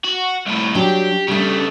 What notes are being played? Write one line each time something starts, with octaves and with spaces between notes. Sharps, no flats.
F#4
C2 A2
F#3 D4 G4
C#3 G3 A3 D4